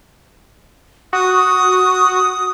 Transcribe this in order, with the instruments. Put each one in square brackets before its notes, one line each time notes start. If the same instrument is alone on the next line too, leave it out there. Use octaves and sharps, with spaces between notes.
[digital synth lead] F#4 [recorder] D#6